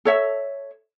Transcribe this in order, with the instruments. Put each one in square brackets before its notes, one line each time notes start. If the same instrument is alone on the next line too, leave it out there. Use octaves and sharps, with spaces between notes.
[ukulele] A4 C#5 E5